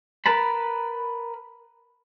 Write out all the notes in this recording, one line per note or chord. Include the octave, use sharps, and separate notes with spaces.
A#4 B4 A5 B5